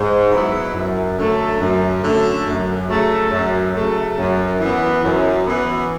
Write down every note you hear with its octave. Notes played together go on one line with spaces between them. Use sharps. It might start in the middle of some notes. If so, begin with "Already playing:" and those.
Already playing: G#2
F#3 B3 E4
F#2
D3 F#3 A3
F#2
D3 F#3 A3
F#2
C#3 F#3 A3
F#2
C#3 F#3 A3
F#2
E3 B3
F#2
E3 B3